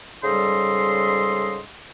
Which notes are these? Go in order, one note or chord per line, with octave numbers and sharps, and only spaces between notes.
G#2 C#3 G3 A4 D#5 C6